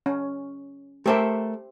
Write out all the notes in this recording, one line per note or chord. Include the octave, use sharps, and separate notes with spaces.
C#4
A3 G4 A4 A#4 C5 E5